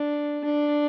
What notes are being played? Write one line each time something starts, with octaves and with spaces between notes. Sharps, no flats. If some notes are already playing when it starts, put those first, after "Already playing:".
Already playing: D4
D4